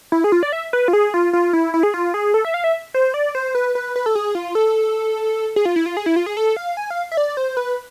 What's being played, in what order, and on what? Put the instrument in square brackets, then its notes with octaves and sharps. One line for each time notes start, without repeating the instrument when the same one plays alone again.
[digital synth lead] E4
G#4
F4
D5
E5
B4
F4
G#4
F4
F4
E4
E4
G#4
F4
G#4
A4
E5
F5
E5
C5
D5
C5
B4
B4
B4
A4
G#4
F4
A4
G#4
F4
E4
F4
G#4
E4
F4
G#4
A4
F5
G#5
F5
E5
D5
C5
B4